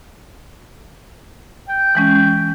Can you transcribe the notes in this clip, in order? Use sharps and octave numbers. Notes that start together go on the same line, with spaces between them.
G5
E3 G#3 C#4